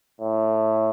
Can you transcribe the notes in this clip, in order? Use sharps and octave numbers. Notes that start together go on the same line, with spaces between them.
A2